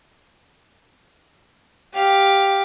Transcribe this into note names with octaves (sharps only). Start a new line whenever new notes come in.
G4 F5